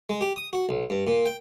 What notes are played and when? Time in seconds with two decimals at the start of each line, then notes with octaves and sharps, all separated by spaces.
0.09 G#3
0.21 G4
0.36 D#6
0.53 F#4
0.69 B1
0.90 G2
1.07 A#2
1.26 G5